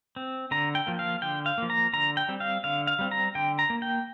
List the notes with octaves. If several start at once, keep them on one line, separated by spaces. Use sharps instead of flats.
C4
D3 A#5
G5
F3 A#3
F5
D3 G5
F5
F3 A#3
A#5
D3 A#5
G5
G3 C4
F5
D3 F5
F5
G3 C4
A#5
D3 G5
A#5
A#3
G5